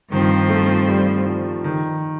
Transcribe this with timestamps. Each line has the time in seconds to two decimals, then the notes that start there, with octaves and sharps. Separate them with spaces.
0.12 G2 D#3 F3 C4
0.50 A3
0.88 G3
1.26 F3
1.64 D#3